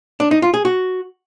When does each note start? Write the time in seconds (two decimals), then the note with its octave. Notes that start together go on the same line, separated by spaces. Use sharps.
0.20 D4
0.31 D#4
0.42 F4
0.54 G#4
0.65 F#4